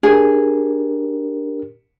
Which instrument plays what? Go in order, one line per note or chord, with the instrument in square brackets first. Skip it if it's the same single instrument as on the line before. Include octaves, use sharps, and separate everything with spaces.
[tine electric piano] D4 G4 A#4 [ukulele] G#4